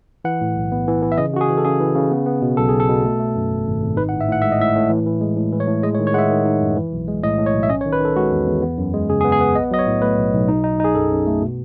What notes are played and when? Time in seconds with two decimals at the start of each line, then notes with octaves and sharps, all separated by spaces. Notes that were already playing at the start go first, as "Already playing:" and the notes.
0.25 E3 F#5
0.41 A2
0.56 B1
0.72 B3
0.87 E3
1.02 E3
1.12 E5
1.18 C#3 D#5
1.33 C#3 F#4
1.41 G#4
1.49 E3
1.58 A4
1.65 C#3 G#4
1.80 E3
1.95 C#3
2.11 B3
2.26 B3
2.42 B2
2.57 B1 A4
2.69 B1 G#4
2.80 A4
2.88 B2
3.04 A3
3.19 A3
3.36 F#2
3.51 G#1
3.66 G#1
3.82 G#1
3.97 D#4 B4
4.09 F#5
4.13 A2
4.21 E5
4.28 A2 F#5
4.42 G#3 E5
4.52 D#5
4.59 A2 E5
4.75 A2
4.90 E3
5.06 E3
5.21 G#3
5.36 A2
5.52 E3
5.60 C#5
5.68 A2
5.83 G#3 D#5
5.95 C#5
5.99 D#3
6.07 C#5
6.14 G#3 F#5
6.18 E5
6.30 D#3
6.46 D#4
6.61 F#2
6.76 E3
6.92 B1
7.08 G#3
7.23 A2 D#5
7.38 A2
7.46 C#5
7.54 B1
7.63 E5
7.69 C#4 D#5
7.81 C#5
7.85 D#3
7.92 B4
8.00 D#3 A4
8.16 G#3 F#4
8.31 E2
8.47 E2
8.62 B3
8.78 F#2
8.93 G#3
9.09 C#3 G#4
9.21 G#4
9.24 B3
9.32 G#4
9.40 B3
9.55 B1 D#5
9.71 F#3 D#5
9.79 C#5
9.87 A2
10.02 A3 B4
10.18 B1
10.33 B1
10.48 D#4
10.64 D#4
10.80 D#4 G#4
10.95 F#2 A4
11.11 F#2
11.27 A3
11.41 B2